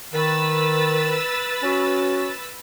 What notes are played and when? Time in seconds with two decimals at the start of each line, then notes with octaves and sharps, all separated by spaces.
0.13 D#3 B4 E6 A6
1.63 C#4 F#4